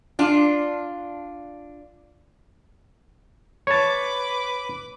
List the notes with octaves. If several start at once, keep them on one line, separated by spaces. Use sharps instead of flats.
D4 F4
B4 C#5 A5 D6